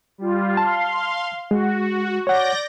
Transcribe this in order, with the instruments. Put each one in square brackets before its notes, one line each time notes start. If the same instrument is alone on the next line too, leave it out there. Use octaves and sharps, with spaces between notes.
[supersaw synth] G3 F4
[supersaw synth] F5 C6 [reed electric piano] A5
[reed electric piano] G#3 [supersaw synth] F#4
[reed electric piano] C#5 F#5 [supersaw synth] D5 G6 A#6